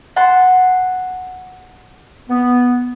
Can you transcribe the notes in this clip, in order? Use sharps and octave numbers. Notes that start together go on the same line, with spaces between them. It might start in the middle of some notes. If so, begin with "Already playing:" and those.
F#5 A5 C6
B3